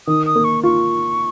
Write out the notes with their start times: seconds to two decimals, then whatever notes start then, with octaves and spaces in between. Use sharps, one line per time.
0.07 D#3 D#6
0.26 D#6
0.36 A#3
0.44 C#6
0.63 F4 C#6